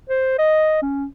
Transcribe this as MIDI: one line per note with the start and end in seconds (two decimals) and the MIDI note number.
0.09 0.37 72
0.39 0.78 75
0.82 1.05 61